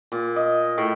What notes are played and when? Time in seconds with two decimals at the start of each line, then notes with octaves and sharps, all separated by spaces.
0.12 A#2
0.36 D#5
0.78 A2